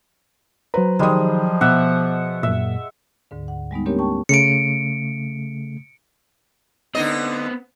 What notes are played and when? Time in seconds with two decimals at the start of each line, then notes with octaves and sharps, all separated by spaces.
0.74 F#3 B4 C5 A#5
0.99 D#3 F3 G3 G#3 D#6
1.61 B2 E5 F#5 D6
2.43 F#2 A#2 E5
3.31 D2 G#2 D3
3.48 F#5
3.71 G3 G#3 B3 D#4
3.86 A#3 C4 D4 G4 A#4 C#5
3.99 G5 A5 C#6
4.29 C#3 A3 C#7 D7
6.95 D3 B3 C4 D#4 D#5